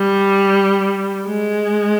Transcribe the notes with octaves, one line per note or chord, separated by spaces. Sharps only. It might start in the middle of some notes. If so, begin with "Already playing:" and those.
Already playing: G3
G#3